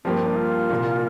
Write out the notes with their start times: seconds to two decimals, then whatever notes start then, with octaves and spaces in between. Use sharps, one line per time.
0.04 G2 F3 A#3 C4 G4
0.15 C4
0.26 D4
0.37 F4
0.70 C2 A#2 A#3